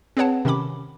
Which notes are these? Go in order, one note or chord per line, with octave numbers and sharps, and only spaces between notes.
C4 G#4 B4 C#5 F#5 A5
C3 D#3 C#4 B5 D6